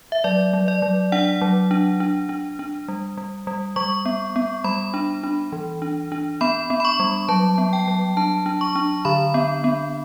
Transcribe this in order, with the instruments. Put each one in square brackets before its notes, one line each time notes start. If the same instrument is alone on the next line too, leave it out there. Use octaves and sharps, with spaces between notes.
[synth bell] E5
F#3 D5
F#3
D5
F#3
D4 F#5
F#3
D4
D4
D4
D4
G3
G3
G3
G3 C#6
B3
B3
G3 B5
D4
D4
E3
D4
D4
B3 B5
B3
B5
C#6
G3
F#3 A5
B3
G5
F#3
D4 A5
D4
C#6
D4
D3 B5
B3
B3